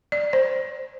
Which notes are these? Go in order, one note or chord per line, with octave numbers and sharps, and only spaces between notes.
D5
C5